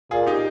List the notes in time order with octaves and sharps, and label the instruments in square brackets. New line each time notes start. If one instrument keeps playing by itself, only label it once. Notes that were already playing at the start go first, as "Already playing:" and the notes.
[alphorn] A#2 [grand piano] F4 G#4
[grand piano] D#4 G4